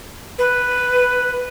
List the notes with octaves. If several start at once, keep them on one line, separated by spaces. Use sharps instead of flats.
B4